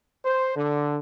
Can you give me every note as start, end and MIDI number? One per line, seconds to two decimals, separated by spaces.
0.24 0.51 72
0.56 0.99 50